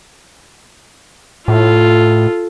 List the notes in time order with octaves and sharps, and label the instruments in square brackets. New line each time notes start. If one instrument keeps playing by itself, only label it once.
[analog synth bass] A2 [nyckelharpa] F4 A4